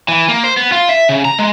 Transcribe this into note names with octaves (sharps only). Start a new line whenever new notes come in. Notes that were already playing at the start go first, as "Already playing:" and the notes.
E3
A#3
C5
B3
F4
E5
C#3
A#5
G#3